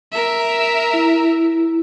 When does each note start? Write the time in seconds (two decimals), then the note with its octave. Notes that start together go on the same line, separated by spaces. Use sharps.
0.12 A#4 E5
0.93 E4